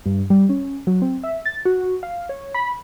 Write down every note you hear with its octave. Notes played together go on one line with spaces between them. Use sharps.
G2
G3
C#4
F#3
C4
E5
A6
F#4
F5
C#5
B5